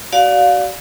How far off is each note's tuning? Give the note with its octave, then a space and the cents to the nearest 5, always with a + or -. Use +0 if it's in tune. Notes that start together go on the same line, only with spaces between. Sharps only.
F#4 +35 D5 -15 F5 +25